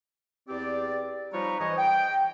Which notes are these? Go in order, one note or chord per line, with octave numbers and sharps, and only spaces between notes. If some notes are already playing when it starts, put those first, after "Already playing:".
E2 C4 G4 D5
F3 G3 D#4 B4 C#5 A#5
G#2 E3 C5 C#5 D#5
G5